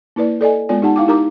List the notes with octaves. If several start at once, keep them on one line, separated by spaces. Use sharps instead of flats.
A#3 E4 B4 D5
A4 D5 D#5 G#5
G#3 B3 F4 D5 G#5
D#4 G4 F#5 A5
E4 F5 G5 D6
D#4 G4 A#4 A#5 D6